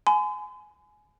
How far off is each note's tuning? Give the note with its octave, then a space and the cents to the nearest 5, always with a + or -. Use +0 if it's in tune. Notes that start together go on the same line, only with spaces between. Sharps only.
G#5 +20 C6 -45